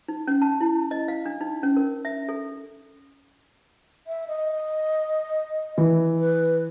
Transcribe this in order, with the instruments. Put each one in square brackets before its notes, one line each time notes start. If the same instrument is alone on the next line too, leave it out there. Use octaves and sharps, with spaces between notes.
[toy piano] D#4
C#4
A5
E4
D#5
F5
D4
D#4
C#4
A#4
E5
A4
[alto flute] E5
D#5
[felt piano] E3
[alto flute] B4